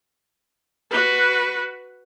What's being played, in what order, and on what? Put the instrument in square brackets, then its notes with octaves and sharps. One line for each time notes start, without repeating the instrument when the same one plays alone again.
[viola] F#4 B4